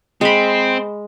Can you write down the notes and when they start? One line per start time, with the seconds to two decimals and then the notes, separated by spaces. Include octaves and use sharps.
0.21 G#3 C4 B5